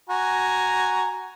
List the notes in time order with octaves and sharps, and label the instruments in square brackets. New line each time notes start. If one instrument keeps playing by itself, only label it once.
[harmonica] F#4 G#5 A#5